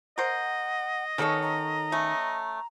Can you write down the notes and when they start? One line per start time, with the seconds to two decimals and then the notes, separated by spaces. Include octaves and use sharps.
0.18 A#4 C5 D#5 F#5
1.18 D#3 B3 C#4 A4 C#5
1.43 A#5
1.92 A3 C#4